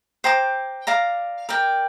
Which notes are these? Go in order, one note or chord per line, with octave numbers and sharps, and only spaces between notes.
C5 G5 A#5 D6
D5 F5 A#5 D6
A#4 D5 G5